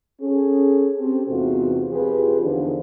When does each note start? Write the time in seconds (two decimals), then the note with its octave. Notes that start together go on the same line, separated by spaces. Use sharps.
0.22 C#4 G#4 A4
1.00 C4 G4 A4
1.29 E2 G#2 C3 B3 F4 F#4
1.91 F2 F3 G4 G#4 B4
2.42 E2 D3 D#3 F3 D4